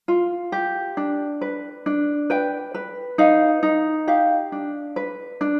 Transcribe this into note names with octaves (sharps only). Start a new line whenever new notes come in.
F4
G4
D4
B4
D4
B4 G5
B4
D#4 F5
D#4
G4 F5
D4
B4
D4